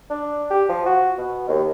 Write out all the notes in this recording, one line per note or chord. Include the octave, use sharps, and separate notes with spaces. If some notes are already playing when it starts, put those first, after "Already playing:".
D4
G4
F3
F#4
B2
D#2